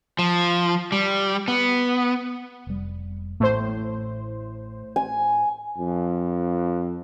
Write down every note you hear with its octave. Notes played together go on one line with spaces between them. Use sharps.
F3
G3
B3
F1 G3
A1 A2 C5
G#5
F2